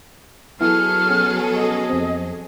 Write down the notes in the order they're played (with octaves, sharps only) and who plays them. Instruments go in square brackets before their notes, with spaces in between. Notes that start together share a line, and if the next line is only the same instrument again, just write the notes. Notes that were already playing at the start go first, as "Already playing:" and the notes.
[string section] F#3 G#4 A4 [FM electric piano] B3 E4 [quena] F6
[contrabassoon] B2 [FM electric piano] C#4
[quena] D#5
[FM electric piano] F2 C4